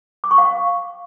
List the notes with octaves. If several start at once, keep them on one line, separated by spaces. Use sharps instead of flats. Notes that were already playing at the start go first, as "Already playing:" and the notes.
D6
C#6
F5